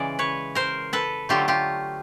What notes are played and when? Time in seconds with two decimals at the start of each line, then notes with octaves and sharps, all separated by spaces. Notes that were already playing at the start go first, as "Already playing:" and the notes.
Already playing: C#3 E3 G#3 D5
0.19 B4 C#5
0.55 A#4 C5
0.93 A4 B4
1.29 D3 F#3 A3 F4 G4
1.48 F4 G4